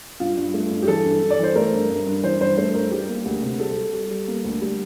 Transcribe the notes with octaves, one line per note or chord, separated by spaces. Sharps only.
G2 F4
G2
A3
G2
G4
E3 A4
G2
G2
D5
E3 C5
A3 A#4
G2
G2
G2
E3 C5
G2 C5
A3 C5
G2 A#4
G3 G4
A#3
D2
C3
G3 A4
G3
G3
G3
A#3
D2
G3